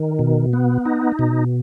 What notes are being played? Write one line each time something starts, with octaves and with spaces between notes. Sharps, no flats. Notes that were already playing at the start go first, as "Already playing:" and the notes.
Already playing: D#3
B2
B3
D#4
B2